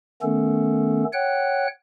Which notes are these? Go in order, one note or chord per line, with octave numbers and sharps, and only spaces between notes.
D#3 A3 B3 C#4 A4
C#5 F#5 G5 F#6